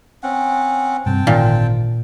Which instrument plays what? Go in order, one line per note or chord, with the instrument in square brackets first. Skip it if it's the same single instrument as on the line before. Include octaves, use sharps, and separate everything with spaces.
[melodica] C4 C#4 F#5
[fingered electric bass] G2 C3 [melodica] C4 G5 A5
[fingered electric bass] G#1 D3 D#3 [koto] A#2